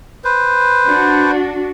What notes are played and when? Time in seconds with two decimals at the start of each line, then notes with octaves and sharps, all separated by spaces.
0.24 B4 C5
0.87 D4 F#4